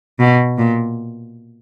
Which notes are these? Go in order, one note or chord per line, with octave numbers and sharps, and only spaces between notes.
B2
A#2